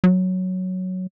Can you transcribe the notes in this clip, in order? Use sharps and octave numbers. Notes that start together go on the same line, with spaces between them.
F#3